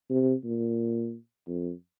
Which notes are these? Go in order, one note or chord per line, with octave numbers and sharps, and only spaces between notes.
C3
A#2
F2